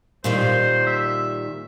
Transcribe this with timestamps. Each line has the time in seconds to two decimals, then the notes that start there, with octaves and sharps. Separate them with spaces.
0.24 A#2 D#3 G3 C5
0.86 E5